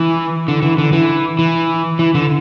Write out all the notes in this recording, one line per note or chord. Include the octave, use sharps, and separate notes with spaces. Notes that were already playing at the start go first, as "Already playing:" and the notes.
Already playing: E3
D3
E3
D3
E3
E3
E3
D3